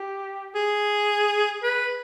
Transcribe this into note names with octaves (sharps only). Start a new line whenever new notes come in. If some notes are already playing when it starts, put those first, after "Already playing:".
Already playing: G4
G#4
B4